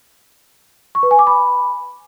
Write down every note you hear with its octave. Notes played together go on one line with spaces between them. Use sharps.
C#6
B4
G#5
D6
B5